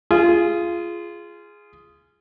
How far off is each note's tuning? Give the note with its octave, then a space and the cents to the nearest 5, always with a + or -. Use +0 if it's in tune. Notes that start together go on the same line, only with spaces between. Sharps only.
F4 -20 G#4 +0